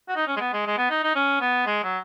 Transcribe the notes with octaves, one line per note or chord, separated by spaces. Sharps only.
F#4
D#4
C#4
G#3
B3
G#3
G#3
B3
D#4
D#4
C#4
B3
G#3
F#3